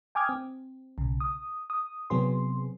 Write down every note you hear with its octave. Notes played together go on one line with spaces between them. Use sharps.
G5 G#5 D6 D#6 F6 G#6
C4
B1 C#3
D#6
D#6
C3 F#3 B3 C4 G#4 C6